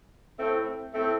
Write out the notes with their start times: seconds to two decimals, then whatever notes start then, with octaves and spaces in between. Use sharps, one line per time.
0.38 A2 A3 C4
0.93 A2 A3 C4